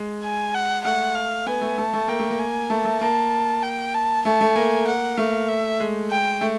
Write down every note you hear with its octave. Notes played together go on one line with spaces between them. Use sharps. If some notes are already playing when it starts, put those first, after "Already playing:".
Already playing: G#3
G#5
F#5
A3 F#5
F5
B3 G#5
A3
A3 A5
A3
A#3 G5
A3
A#3
G#5
A3 A5
A3
A#3 A5
G5
A5
A3 A5
A3
A#3 G#5
F#5
A3 F5
E5
G#3
G5
A3